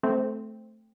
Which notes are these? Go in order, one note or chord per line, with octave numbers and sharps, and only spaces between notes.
A3 C4